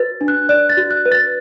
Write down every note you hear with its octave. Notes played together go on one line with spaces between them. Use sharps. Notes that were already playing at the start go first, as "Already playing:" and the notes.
Already playing: F#4 B4 A6
D4
F#6
D5 F#6
A6
F#4
F#6
B4
A6